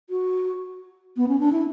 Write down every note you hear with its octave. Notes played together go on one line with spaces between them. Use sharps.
F#4
B3
C#4
D4
E4